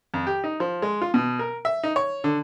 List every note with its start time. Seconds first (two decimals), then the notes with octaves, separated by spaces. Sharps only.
0.14 F2
0.27 G4
0.44 D#4
0.60 F3
0.82 G#3
1.02 F4
1.14 B2
1.39 A#4
1.65 E5
1.84 D#4
1.96 C#5
2.24 D3